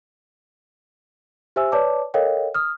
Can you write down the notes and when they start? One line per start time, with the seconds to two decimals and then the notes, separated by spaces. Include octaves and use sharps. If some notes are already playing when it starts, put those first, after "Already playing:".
1.56 G4 C5 E5 G#5 E6
1.72 B4 C#5 D5 A5 D6
2.14 A4 A#4 C#5 D#5 F5 G5
2.55 D#6 F6